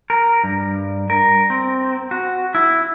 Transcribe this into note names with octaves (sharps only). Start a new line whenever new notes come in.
A#4
G2
A#4
C4
F#4
E4